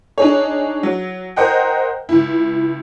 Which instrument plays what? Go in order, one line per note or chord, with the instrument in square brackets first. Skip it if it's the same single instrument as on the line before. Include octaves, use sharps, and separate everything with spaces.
[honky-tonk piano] D4 D#4 G#4 C#5
F#3
A#4 C5 D#5 F#5 G5
C#2 E4